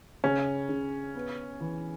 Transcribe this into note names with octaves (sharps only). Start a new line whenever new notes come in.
C#3 C#4
C#3
B3
E3